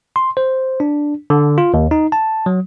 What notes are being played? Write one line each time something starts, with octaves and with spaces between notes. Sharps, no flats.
C6
C5
D4
D3
F4
D#2
D#4
A5
F#3